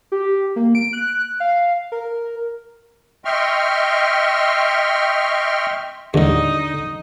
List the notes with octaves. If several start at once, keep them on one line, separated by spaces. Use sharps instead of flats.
G4
A#3
D7
F#6
F5
A#4
D#5 E5 G5 C6 C#6 F6
D#2 A2 D3 D#4 D#5